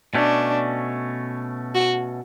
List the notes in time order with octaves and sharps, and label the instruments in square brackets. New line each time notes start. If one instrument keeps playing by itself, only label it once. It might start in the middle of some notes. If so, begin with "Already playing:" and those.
[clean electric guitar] B2 A3 C#4 [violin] D4
[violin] F#4